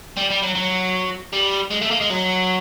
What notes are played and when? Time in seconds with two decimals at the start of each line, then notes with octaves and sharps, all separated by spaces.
0.17 G3
0.30 G3
0.43 F#3
0.55 F#3
1.33 G3
1.71 G#3
1.82 A3
1.91 A#3
2.01 G#3
2.10 F#3